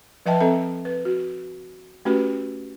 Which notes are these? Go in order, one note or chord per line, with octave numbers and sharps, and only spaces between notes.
F3 B4 D#5 E5 G5 A5
C4 A4 E5
B4
F#4
A3 C#4 F#4 G4 B4